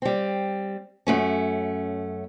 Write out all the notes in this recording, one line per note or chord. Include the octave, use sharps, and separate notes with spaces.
G3 C4
F#2 A3 C#4